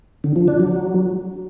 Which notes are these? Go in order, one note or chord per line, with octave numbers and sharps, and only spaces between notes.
D3
F3
D4
F#3